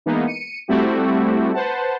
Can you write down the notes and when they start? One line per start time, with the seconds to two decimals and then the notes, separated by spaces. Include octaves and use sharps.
0.06 E3 G#3 A#3 B3 D#4
0.27 C#7 D#7
0.68 G3 A3 C4 E4 F#4 G4
1.53 B4 C5 F#5 A5